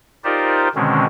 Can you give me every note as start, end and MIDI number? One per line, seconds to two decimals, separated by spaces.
0.24 0.68 63
0.24 0.68 65
0.24 0.68 67
0.24 0.68 70
0.24 0.68 72
0.24 0.68 74
0.75 1.06 47
0.75 1.06 50
0.75 1.06 51
0.75 1.06 56
0.75 1.06 60
0.75 1.06 61